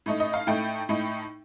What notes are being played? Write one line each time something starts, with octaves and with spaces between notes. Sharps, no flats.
A2 A3 D#4
D#5
F5
A2 A3 D#4 G5
A2 A3 D#4